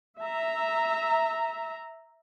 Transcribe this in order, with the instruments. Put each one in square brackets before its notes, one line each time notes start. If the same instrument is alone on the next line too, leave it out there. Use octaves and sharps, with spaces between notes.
[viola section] E5 A#5